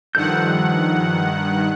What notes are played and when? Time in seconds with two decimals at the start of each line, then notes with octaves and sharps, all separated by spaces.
0.15 G2 D#3 F3 A4 F#5 G6